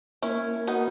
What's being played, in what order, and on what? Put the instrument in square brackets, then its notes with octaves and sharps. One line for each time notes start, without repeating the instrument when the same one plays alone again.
[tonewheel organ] A#3 [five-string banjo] C#4 E4
[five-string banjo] B3 D#4 [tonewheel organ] F#4